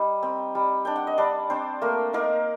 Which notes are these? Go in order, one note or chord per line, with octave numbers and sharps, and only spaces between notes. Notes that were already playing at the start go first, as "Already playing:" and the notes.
Already playing: G3 D#4 D#5
C4
G3
D4 G5
F#5
D#5
G3 D4 D5
C4 D4 C5
A3 A#3 A#4
A#3 D#4 A#4